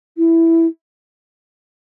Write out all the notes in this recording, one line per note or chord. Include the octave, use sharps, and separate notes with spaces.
E4